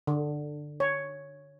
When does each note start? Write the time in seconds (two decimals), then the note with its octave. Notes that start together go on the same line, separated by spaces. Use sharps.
0.07 D3
0.80 C#5